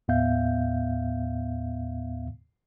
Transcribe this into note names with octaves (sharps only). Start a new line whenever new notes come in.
D#2 A2 B3 E5 F5 G6